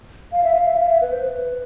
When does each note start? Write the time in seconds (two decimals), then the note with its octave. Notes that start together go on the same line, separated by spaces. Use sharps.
0.32 F5
0.44 E5
0.54 F5
0.66 E5
0.77 F5
0.87 E5
1.02 B4
1.12 C5
1.23 B4